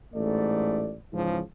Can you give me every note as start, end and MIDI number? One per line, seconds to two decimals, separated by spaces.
0.14 0.93 33
0.14 0.93 44
0.14 0.93 57
0.14 0.93 74
1.13 1.39 44
1.13 1.39 49
1.13 1.39 52
1.13 1.39 53